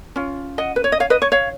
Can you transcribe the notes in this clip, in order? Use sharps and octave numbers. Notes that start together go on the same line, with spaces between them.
C#4 F4
D#5 F#5
B4
C#5
D#5
C#5 F5
B4 D#5
C#5
C#5 F5